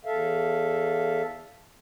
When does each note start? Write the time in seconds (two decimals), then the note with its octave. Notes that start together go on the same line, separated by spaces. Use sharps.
0.05 E2 A4 E5 F5